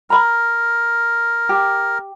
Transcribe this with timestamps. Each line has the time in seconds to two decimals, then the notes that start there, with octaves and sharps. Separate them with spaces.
0.10 A#4 A#5 B5
1.49 G4